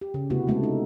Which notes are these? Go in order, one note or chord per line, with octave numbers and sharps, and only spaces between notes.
G4
C#3
C3 A3 B3 C#4 E4 F#4
G#3 A3 B3 A4
D#4